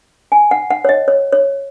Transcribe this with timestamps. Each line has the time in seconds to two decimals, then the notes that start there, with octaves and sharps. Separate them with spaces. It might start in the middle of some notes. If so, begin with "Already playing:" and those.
0.32 G#5
0.51 F#5
0.70 F#5
0.85 C#5
0.89 D#5
1.08 C#5
1.32 C#5